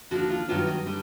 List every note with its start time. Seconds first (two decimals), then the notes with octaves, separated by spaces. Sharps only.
0.11 D#2 D3 F3 F#4
0.30 F4
0.48 G2 D#3 F#3 B3 D4 F4
0.67 D#4
0.86 D3 G3